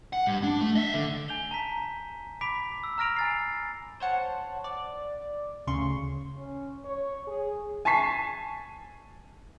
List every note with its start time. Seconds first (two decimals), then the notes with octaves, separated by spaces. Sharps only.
0.13 F#5
0.27 G2
0.43 D4
0.61 A3
0.75 D#5 E5
0.94 D3
1.28 G#5 G6 F7 G7
1.51 A5 A#5 B6
2.41 B5 D6 B6 D7 F7
2.84 E6
2.98 A#5 F6 A#6 D7 F7
3.16 G#5 A6 C7
4.00 C5 C#5 F#5 A5
4.64 D5
5.67 D2 C#3 C6 C#6
6.37 C#4
6.85 C#5
7.27 G#4
7.85 G#5 A5 C#6 B6 C7